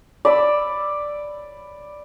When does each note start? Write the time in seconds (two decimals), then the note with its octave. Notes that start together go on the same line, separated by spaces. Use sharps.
0.25 D5 B5 E6